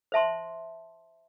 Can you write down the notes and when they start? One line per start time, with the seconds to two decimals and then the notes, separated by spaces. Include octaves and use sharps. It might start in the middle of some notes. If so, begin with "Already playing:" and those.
0.12 C5 E5 A5 C6